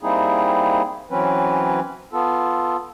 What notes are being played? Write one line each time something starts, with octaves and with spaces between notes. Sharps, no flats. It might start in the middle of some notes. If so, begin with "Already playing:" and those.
G3 A#3 C4 D#4 E4 G#4
E3 F#3 C4 C#4 B4
B3 F4 A4